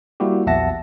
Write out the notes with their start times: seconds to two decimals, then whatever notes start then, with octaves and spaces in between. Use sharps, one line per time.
0.20 G3 A#3 E4 F#4 G4
0.47 A#1 E2 E5 F#5 A5 A#6